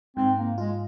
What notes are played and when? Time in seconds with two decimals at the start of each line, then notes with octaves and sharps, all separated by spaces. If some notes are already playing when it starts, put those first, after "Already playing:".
0.17 G#2 C4
0.38 A#3
0.58 G#3 F4